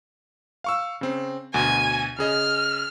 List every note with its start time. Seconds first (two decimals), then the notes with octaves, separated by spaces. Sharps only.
0.64 F5 C#6 E6
1.01 C#3 C4
1.54 D2 B2 G#5
2.19 C#3 G#4 D#5 F6